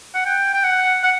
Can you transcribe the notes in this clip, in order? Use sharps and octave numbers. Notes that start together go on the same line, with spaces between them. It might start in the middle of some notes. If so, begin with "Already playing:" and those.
F#5
G5
G5
F#5
F#5